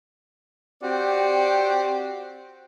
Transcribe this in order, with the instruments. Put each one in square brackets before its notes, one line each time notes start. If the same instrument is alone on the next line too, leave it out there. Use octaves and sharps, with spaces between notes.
[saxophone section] C4 F#4 G4 D5